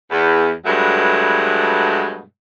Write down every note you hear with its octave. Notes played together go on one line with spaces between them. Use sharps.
E2
G2 B2 F#3 G#3 A3